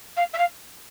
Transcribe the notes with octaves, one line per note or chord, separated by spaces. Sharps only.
F5
E5
F5